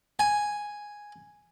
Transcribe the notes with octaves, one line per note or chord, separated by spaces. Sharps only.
G#5